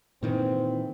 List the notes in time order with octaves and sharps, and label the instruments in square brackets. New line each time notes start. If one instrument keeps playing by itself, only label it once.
[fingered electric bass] A#2 D#3 E3 [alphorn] C4